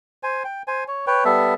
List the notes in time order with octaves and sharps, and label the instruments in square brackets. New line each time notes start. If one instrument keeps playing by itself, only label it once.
[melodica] C5 G#5
G5
C5 G#5
C#5
B4 C#5 G5
G3 B3 A4 E5